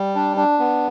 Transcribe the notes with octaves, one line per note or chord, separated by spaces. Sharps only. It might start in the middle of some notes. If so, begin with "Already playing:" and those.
Already playing: G3
D4
D4
B3